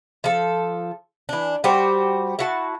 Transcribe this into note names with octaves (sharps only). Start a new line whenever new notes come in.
F3 A4
E3 D4
G3 F#4 G4 C5
E4 F#4 A5